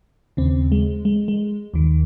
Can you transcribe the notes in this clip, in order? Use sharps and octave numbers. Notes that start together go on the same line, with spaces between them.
D#2 C#3 C4
G#3
G#3
G#3
D#2 D#3